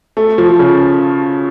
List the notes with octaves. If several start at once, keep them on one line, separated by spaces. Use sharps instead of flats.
A3
F3
C#3